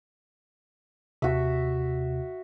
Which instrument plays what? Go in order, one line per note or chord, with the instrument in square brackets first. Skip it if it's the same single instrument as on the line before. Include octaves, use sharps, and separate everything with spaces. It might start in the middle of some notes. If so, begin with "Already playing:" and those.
[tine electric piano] D#2 C3 [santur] F#4 E5